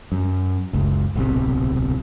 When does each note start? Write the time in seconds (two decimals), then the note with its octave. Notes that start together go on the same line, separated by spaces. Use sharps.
0.12 F#2
0.73 F#1 C#2
1.15 D1 B1 C3